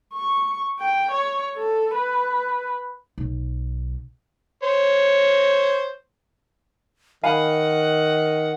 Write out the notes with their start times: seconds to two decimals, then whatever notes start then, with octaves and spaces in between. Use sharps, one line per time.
0.14 C#6
0.80 G5
1.12 C#5
1.57 A4
1.95 B4
3.18 B1
4.63 C5 C#5
7.23 D#3 F5 F#5 G#5 B5